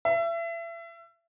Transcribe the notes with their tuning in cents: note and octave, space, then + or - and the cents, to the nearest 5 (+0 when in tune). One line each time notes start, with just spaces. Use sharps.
E5 +30